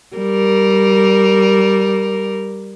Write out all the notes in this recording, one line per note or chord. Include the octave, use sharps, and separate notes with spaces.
G3 A#4